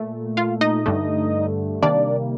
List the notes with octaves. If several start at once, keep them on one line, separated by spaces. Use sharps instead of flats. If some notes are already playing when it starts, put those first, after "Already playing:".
Already playing: A#2 A3
F4 F5
D#4 D#5
G2 D3 A3
C3 D#3 G3 A#3 D4 D5